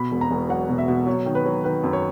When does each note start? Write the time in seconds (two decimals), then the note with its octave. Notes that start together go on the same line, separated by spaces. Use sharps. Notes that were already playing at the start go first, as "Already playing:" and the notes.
Already playing: B2 B5
0.11 E1
0.21 A#5
0.31 E1
0.49 F#3 F#5
0.69 B2
0.78 E5
0.88 B2
1.07 F#3 C#5
1.26 D#3
1.35 B4
1.46 F#3
1.64 D#3 B4
1.84 F#2
1.93 C#5